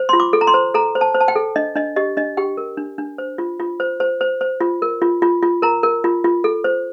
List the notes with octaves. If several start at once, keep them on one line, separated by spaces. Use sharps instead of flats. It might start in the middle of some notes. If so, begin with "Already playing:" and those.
Already playing: C5
F4 C6
D6
A4
A#5
C6
C5
A4 A#5
C5
A5
C5
A5
G5
A4
D4 D#5
D4 D#5
G4 D#5
D4 D#5
G4 G5
A#4
D4
D4
C5
F4
F4
C5
C5
C5
C5
F4
A#4
F4
F4
F4
A#4 A#5
A#4
F4
F4
A4
C5